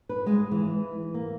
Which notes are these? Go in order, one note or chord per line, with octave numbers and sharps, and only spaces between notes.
B4
G#3
E3
A#3